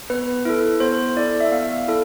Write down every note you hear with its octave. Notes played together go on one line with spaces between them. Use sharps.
B3 B4
E4 A4
B3 C5
E4 A4 D5
E5
B3 F5
E4 A4